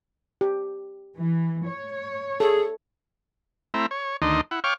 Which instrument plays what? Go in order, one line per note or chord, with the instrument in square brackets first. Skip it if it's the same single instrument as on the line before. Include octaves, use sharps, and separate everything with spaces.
[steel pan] G4
[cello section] E3
C#5
[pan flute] G#4 [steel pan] A4
[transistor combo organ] A3 C4 E4 E5 A#5
C#5
D2 D#3 D4 D#4 D#5 C6
E4 F#5
C#5 F5 G5 C#6 D6 F6